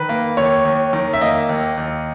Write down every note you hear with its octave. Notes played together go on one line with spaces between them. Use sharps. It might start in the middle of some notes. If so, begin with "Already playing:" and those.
Already playing: D#3 B4
A#3
D#2 C#5
D#2
D#3
E5
A#3 D#5
D#2
D#2